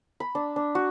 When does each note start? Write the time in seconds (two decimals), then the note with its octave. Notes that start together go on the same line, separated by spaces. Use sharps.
0.20 B5
0.35 D4
0.56 D4
0.75 F#4